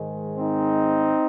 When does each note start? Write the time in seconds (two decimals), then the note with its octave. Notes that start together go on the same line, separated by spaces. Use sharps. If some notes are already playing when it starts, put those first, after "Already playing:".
Already playing: G#2 D#3 G#3
0.37 C4 D#4